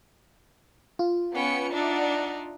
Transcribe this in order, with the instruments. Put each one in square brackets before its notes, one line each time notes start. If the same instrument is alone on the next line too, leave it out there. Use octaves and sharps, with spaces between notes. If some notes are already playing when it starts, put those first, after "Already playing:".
[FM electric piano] F4
[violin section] B3 C#7 [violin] C#4 G5
[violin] D4 D#4 [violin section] D5 E5 F#5